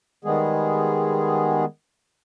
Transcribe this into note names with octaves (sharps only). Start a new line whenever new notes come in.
D#3 G3 G#3 B3 G#4